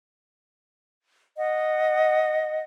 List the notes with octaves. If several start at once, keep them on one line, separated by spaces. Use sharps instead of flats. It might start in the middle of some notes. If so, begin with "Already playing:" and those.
D#5 F#5